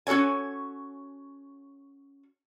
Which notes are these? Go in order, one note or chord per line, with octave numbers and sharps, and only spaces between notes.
C#4 F#4 A4 C#5 G#5